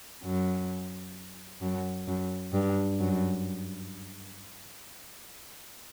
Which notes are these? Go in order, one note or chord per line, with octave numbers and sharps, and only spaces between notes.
F#2
F#2
F#2
G2
F#2